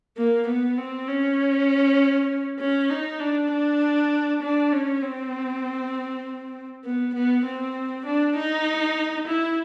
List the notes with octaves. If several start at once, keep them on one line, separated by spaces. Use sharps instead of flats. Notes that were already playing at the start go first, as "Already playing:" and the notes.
A#3
B3
C4
C#4
C#4
D#4
D4
D4
D4
C#4
C4
B3
B3
C4
D4
D#4
E4